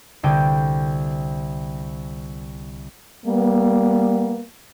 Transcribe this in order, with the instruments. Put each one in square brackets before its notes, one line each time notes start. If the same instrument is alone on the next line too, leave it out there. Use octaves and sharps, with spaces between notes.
[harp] C2 D3 G5 D#7
[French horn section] G3 A#3 B3